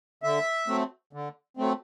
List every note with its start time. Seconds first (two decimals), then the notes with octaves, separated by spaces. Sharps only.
0.23 D3 E5
0.68 F#3 A3 C4
1.13 D3
1.57 F#3 A3 C4